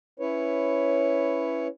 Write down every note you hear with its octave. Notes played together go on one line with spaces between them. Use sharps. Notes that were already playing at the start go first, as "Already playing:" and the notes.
C#4 E4 B4 C#5